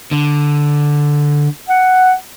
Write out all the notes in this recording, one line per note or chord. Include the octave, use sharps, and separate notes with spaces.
D3
F#5